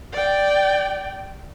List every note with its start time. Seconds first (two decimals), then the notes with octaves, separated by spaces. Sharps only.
0.13 D5 G5